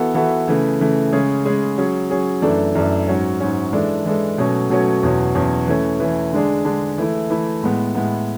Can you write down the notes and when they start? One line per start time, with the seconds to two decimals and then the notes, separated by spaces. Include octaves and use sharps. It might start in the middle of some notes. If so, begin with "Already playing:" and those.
Already playing: E3 B3 F#4 A4
0.15 E3 B3 F#4 A4
0.48 C#3 E3 A3
0.80 C#3 E3 A3
1.12 C#3 G#3 C#4 G#4
1.45 C#3 G#3 C#4 G#4
1.78 F#3 C#4 G#4
2.10 F#3 C#4 G#4
2.42 F#2 E3 A3 D4 A4
2.75 F#2 E3 A3 D4 A4
3.08 G#2 F#3 C#4
3.40 G#2 F#3 C#4
3.73 E3 G#3 D4 A4
4.05 E3 G#3 D4 A4
4.38 B2 F#3 A3 C#4
4.70 B2 F#3 A3 C#4
5.03 E2 B2 F#3 C#4
5.35 E2 B2 F#3 C#4
5.68 E3 A3 C#4
6.00 E3 A3 C#4
6.33 D3 G#3 D4 G#4
6.65 D3 G#3 D4 G#4
6.98 E3 A3 E4
7.30 E3 A3 E4
7.63 A2 G#3 B3
7.95 A2 G#3 B3